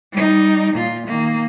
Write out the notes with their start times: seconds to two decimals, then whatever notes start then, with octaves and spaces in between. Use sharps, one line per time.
0.13 G3 D#4
0.73 A#2 F4
1.07 D#3 A#3